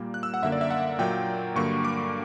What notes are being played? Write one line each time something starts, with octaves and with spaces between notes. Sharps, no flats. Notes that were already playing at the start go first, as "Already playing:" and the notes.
Already playing: A#2 G3 A#3
F#6
E6
F#5
F#2 D3 A#3 E5
D5
E5
F#5
A#2 F#3 A#3 G5
G2 D3 F#3 A#3 C#6
D6